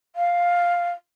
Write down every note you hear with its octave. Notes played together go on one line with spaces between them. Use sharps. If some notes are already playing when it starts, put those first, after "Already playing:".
F5